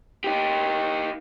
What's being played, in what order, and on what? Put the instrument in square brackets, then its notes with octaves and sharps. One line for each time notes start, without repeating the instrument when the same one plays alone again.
[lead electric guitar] D#4 G4